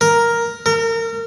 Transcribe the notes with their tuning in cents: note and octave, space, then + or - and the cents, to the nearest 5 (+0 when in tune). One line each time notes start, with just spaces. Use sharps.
A#4 +5
A#4 -30